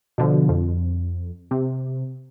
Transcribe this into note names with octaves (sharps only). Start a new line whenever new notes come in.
B2 D3 F3
F2
C3